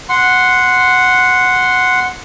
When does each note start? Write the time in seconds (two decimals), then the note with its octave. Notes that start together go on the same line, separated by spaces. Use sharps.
0.09 F#5 C6